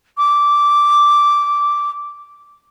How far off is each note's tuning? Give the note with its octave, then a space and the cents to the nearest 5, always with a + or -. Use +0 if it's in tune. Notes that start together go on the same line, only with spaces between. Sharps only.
D6 -10